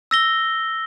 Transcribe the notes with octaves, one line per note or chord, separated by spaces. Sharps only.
E6 A#6 G7